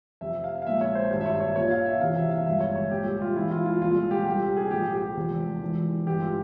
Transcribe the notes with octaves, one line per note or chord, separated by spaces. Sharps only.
F1 F2 C3 E5
F5
F5
A#1 A#2 G#3 E5
C#5
C5
G#1 G2 G3
E5
C#5
C#5
A#1 A#2 F3 C#5
F5
E5
E1 E2 C3 E3 F5
E5
F5
G1 G2 F3 G#3 E5
C#5
C#5
C2 A#2 G#3 G4
G4
F4
E2 E3 G#3 E4
F4
F4
C2 A#2 F3 G#3 F4
G4
C2 C3 G3 G4
G#4
A#1 G#2 F3 G#3 G4
G4
F1 E2 C3 F3 G#3
E1 E2 E3 G#3
G1 G2 E3 G#3 G4
F4